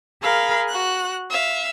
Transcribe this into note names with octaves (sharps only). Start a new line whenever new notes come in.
G#4 A#4 F5 B5
F#4 F#6
E5 F5